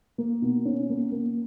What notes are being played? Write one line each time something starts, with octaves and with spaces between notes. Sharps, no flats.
A#3
B2
C#4
A#3
A#3